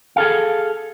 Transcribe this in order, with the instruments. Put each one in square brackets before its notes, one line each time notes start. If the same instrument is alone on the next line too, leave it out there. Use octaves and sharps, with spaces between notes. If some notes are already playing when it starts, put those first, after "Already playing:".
[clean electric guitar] G#4 A4 F5